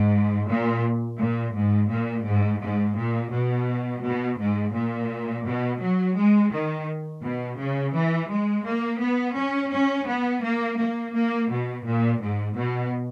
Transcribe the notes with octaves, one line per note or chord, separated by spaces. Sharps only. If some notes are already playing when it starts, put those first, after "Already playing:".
Already playing: G#2
A#2
A#2
G#2
A#2
G#2
G#2
A#2
B2
B2
G#2
A#2
B2
F#3
G#3
D#3
B2
C#3
E3
G#3
A#3
B3
C#4
C#4
B3
A#3
A#3
A#3
B2
A#2
G#2
B2